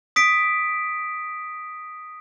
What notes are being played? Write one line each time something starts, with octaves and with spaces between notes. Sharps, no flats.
D#6 B6 D7